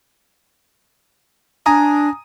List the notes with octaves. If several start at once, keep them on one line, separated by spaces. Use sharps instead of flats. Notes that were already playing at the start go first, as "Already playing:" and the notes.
D4 G#5 A#5 D#6